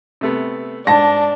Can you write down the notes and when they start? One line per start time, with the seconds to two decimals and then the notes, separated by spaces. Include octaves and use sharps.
0.21 C3 A3 B3
0.87 G#2 D4 A5 A#6